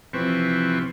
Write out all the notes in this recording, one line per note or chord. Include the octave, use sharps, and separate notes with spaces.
C3 E3 F3 C4 B4 C#6